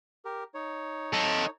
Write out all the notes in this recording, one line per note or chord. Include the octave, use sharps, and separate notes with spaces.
G4 A#4
D#4 C#5
A4 D#5